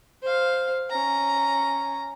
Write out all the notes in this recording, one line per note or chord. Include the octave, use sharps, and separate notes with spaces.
C5 F5
C#4 A#5